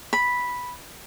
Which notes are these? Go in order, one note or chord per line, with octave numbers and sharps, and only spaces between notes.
B5